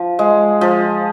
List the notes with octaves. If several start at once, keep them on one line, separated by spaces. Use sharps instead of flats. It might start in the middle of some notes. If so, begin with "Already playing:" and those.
Already playing: F3
G#3
F3